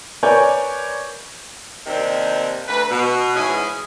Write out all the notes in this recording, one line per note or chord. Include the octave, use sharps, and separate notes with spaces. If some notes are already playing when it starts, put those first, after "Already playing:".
A#4 B4 C#5 D5 G#5 G6
D#2 C3 D#3 C4 D4
D2 B4
B2
G#2 E3 C#4 E4 G#4